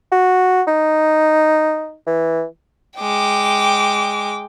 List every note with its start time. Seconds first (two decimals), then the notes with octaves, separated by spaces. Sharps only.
0.12 F#4
0.67 D#4
2.06 E3
2.99 G#3 G5 D6